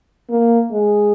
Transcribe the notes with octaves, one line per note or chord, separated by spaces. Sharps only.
A#3
G#3